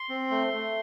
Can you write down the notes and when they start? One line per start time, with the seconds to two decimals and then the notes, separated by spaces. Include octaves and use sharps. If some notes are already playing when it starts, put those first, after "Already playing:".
Already playing: C6
0.10 C4
0.31 A3
0.53 A3